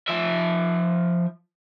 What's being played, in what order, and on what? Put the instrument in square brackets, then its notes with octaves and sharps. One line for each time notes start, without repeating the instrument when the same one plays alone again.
[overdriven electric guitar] F3 E5